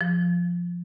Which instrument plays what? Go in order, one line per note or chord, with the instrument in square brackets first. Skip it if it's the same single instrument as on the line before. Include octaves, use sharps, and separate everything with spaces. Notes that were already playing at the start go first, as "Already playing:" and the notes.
[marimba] F3